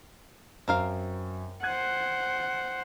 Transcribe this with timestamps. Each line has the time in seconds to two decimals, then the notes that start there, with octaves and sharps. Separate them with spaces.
0.68 F#2 C4 A#4 F5
1.63 C5 F#5 F#6 G#6 D#7